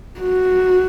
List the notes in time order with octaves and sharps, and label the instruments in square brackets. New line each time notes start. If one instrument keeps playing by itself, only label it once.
[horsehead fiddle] F#4